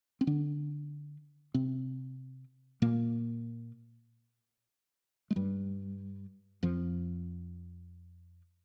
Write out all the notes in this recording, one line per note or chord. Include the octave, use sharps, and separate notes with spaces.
C4
D3 D4
C3 C4
A#2 A#3
G#3
G2 G3
F2 F3